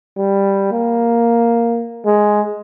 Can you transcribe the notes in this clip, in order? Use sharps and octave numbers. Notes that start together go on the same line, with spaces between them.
G3
A#3
G#3